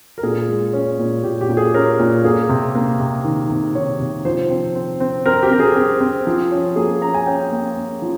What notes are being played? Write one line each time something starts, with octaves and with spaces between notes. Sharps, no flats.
A#4
A#2 G#4
G#3
C#4
A#2
A#2 G4
G4
A#2
G#4
C#4 A#4
A#2
A#3 G#4
C3
A#3
C3
D#3
C3
D#3 C#5
C3
F3 C5
C4
C4
C4
C4 A#4
G4
C4 A#4
G#4
C4
C4
F3
C#4
A#3 G#4
C#4 A#5
G#5
C#4 G5
A#3
A#3
F3